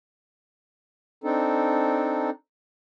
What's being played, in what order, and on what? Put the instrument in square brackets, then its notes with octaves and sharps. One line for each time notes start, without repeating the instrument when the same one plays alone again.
[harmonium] C4 D4 D#4 A4